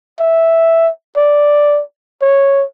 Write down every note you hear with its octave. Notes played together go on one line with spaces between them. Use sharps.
E5
D5
C#5